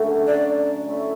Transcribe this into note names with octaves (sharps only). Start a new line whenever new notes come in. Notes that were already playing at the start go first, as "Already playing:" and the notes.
Already playing: D3 F#3 A3 C#4
D5
A3 C#4 E4